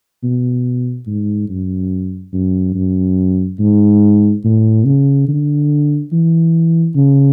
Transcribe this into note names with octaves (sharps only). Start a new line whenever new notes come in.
B2
G#2
F#2
F#2
F#2
G#2
A2
C#3
D3
E3
C#3